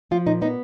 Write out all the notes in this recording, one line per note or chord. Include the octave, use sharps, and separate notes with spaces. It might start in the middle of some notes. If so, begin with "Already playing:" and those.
F3 F4
A#2 D#4
B3 D#4